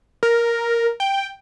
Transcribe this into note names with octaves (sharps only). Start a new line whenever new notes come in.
A#4
G5